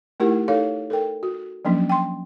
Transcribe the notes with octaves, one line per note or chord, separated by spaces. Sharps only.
A3 D#4 E4 G4 A#4 F#5
D#4 A4 C#5 F5
A4 A#4 G5
F#4
F3 F#3 A#3 C#4 D4
G5 C6